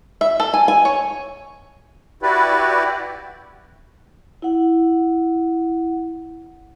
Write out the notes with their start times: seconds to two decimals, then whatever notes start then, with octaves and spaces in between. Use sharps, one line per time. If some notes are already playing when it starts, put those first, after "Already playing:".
0.21 E5
0.40 A4
0.54 G#5
0.68 G#5
0.85 C#5
2.22 E4 F#4 G4 B4 D5
4.42 E4 F#5